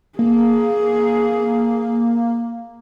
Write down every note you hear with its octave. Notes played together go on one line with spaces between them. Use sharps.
A#3 G#4